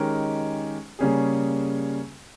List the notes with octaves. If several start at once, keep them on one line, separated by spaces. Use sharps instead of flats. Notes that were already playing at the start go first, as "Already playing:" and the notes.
Already playing: D#3 G#3 C#4 G4 A#4
C#3 G3 A#3 C#4 G#4